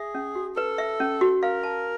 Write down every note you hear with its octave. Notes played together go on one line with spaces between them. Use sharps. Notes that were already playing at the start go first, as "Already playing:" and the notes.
Already playing: G#4 E5
C#4
F#4
A4 B4
E5
C#4
F#4
A#4 F5
A5